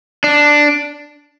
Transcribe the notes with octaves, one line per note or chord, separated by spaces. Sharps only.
D4